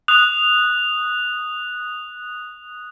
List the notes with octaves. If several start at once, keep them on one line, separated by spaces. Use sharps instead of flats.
D#6 F#6 F7